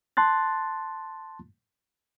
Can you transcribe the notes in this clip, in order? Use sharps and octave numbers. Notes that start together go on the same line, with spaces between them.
A5 C6 F#6 A6